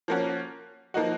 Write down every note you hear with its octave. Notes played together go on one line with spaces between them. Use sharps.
F3 A#3 C#4 F#4
F3 A#3 D#4 F#4